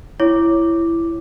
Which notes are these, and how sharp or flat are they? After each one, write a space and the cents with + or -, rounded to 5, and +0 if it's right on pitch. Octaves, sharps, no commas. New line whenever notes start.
E4 +15 C#5 +0 D6 +0